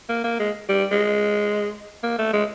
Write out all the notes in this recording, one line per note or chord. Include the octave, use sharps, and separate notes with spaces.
A#3
A#3
G#3
G3
G#3
A#3
A3
G#3